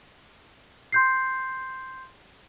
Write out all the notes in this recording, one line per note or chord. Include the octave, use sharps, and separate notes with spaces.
C6 G6 C7